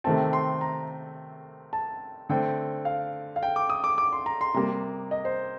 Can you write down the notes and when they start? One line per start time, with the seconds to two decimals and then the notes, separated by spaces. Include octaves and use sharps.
0.04 C3 D#3 A3 C4 A5
0.33 C6
0.61 A#5
1.73 A5
2.29 D3 A3 C4 G5
2.85 F5
3.36 F5
3.43 G5
3.56 D6
3.70 D#6
3.84 D6
3.98 D6
4.13 C6
4.26 A#5
4.41 C6
4.54 C3 G3 A#3 A#5
5.11 D#5
5.25 C5